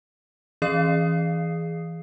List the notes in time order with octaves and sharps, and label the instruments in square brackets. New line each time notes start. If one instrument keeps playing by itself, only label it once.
[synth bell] E3 G#4 F5 D#6 C7